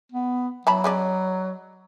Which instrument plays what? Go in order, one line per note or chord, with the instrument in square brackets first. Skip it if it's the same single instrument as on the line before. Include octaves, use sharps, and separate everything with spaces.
[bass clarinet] B3
[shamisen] E3 A5 B5 [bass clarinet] F#3
[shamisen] G#3 C#4 D5